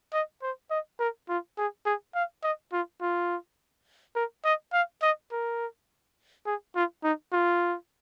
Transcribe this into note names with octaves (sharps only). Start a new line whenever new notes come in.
D#5
C5
D#5
A#4
F4
G#4
G#4
F5
D#5
F4
F4
A#4
D#5
F5
D#5
A#4
G#4
F4
D#4
F4